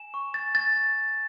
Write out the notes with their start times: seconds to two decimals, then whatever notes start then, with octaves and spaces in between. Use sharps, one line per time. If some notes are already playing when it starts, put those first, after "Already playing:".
Already playing: G#5 E7
0.14 C#6
0.34 G#5 A6
0.55 C#6 A6